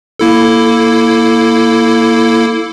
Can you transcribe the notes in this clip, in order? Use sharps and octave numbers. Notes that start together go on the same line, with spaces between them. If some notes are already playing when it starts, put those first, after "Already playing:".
A#3 E4 A4